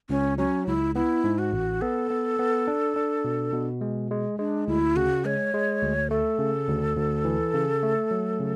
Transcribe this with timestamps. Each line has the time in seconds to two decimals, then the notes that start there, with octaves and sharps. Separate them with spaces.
0.09 C#2 C#4
0.38 F#3 C#4
0.67 C#2 E4
0.95 B3 E4
1.24 G#2
1.38 F#4
1.53 A1
1.81 B3 A4
2.10 B3
2.39 B3
2.67 D4
2.96 D4
3.25 B2
3.53 B2
3.81 G#3
4.11 G#3
4.39 G#3 D4
4.67 D2 E4
4.96 C#3 F#4
5.25 G#3 C#5
5.54 G#3
5.82 D2
6.11 A3 A4
6.39 C#3
6.68 D2
6.97 D2
7.25 E3
7.54 C#3
7.83 A3
8.11 F#3
8.39 C#3